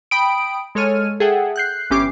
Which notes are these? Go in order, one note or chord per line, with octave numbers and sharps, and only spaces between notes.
G5 B5 D#6 D7
G#3 A4 C#5 F6 D#7
G#4 A4 E5 F#5 G5
F#6 G6 C7
G1 E3 C#4 G4 D6 C7